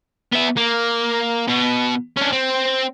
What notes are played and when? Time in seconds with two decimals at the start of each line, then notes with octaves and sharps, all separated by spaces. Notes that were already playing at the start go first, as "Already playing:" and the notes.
0.32 B3 E5
0.57 A#3
1.48 B2 B3
2.17 C#4 D4
2.33 C4